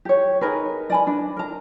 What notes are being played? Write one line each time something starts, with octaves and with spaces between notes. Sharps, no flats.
G4 C#5
D#4 G#4 A#4 B4
D5 G#5 B5
D4
A#4 A#5